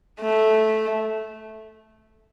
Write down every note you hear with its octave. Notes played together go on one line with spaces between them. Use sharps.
A3